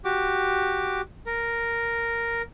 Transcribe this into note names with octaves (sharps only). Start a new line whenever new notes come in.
F#4 G4 D6
A#4